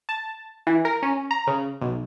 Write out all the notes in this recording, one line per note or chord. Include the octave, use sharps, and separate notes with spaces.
A5
E3
A#4
C#4
A#5
C#3
B1